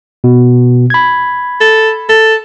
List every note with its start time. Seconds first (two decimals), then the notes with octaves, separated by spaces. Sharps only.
0.24 B2
0.90 B5 G#6
1.61 A4
2.09 A4